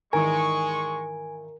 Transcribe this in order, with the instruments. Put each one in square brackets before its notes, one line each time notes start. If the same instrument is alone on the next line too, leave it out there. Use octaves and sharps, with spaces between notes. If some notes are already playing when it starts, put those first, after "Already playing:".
[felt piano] G#1 D#3 E3 [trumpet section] G#3 C#6 [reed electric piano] A#4 [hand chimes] G#5